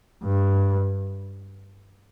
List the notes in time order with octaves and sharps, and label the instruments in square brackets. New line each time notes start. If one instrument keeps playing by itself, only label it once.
[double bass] G2